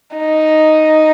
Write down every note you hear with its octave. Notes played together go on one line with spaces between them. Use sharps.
D#4